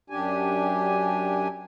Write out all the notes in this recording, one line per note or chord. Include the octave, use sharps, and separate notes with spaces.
F#2 D4 G4 G#5